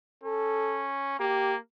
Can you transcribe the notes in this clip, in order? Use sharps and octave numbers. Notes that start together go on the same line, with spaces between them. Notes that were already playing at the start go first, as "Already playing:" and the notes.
C#4 A4
A#3 G4